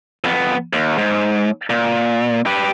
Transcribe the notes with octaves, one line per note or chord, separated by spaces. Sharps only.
F2 B3
D#2
G#2
A#2
G4 B4